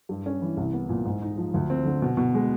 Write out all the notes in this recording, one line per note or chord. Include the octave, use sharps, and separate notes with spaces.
G2
C#4
E3
C2
B3
A#2
G#2
D#4
F3
D2
C4
D3
B2
B2
G#3